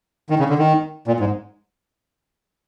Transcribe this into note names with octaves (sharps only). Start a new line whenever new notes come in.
D#3
C#3
D3
D#3
A#2
G#2